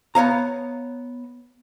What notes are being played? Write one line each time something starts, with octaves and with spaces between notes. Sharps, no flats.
B3 C#5 F5 A#5